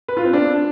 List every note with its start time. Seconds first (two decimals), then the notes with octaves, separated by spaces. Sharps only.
0.08 B4
0.17 F4
0.25 C4
0.33 D4